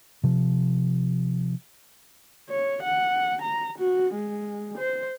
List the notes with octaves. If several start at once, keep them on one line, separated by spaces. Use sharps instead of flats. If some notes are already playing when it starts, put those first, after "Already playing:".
C3 F3
C#5
F#5
A#5
F#4
G#3
C5